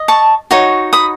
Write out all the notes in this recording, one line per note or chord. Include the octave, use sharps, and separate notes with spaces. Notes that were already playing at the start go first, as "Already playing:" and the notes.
Already playing: D#5
A5 C#6
D#4 F#4 C#5
B5 D#6